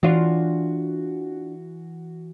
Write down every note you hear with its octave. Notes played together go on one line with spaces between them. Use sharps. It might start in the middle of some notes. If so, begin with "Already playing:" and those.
E3 D4 F4 F#4